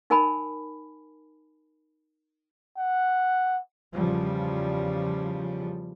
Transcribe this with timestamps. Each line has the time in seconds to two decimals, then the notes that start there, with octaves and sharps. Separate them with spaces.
0.10 D#4 A#4 G#5 A5 B5
2.78 F#5
3.93 E2 C#3 F3 G3